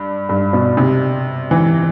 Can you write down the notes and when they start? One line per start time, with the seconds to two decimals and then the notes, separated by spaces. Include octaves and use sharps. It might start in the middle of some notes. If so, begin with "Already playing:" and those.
Already playing: G2
0.29 G2
0.53 B2
0.77 C3
1.51 E3